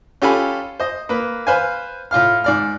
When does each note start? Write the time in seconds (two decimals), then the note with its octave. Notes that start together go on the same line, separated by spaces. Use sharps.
0.22 C#4 F4 G4 A4 G#5 B5
0.80 C5 D#5
1.09 A#3 B4
1.47 B4 C5 F5 G#5
2.11 A2 F4 F5 F6
2.44 G#2 D5 F6